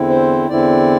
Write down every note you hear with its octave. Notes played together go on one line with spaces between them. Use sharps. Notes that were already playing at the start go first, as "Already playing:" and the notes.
Already playing: E2 D3 C4 E4
C5
E2 D3 C4 E4 D5